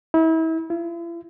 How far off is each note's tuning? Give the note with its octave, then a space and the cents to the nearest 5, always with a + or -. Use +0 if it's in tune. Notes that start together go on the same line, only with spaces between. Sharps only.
E4 -35
E4 +45